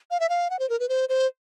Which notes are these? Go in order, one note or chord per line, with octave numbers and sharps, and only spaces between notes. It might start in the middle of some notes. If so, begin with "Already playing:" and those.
F5
E5
F5
F#5
C5
A#4
B4
C5
C5